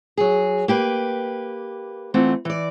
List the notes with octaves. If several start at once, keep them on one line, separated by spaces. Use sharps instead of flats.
F#3 G#4
A#3 G4 B4
E3 A3 C4 F4 F#5
E3 D5